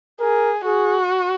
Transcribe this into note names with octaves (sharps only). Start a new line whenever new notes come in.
G#4 A#4
F#4 G#4